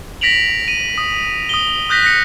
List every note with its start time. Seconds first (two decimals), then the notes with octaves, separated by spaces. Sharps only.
0.21 A#6 B6 D7 F7 F#7
0.68 D#7
0.98 D#6
1.49 D#6 G7
1.89 D#6 F#6 G6 A#6 B6
2.02 F#6 A#6 C#7